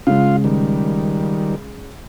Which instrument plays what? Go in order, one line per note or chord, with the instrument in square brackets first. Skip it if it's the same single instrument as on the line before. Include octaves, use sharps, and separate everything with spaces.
[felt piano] C#3 G#3 [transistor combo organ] F4 F5
[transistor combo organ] D#3 G3